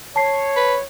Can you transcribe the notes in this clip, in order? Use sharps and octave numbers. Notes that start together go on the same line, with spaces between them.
C#5 A5 C7
B4